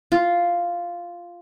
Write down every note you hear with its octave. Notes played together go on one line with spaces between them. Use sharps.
F4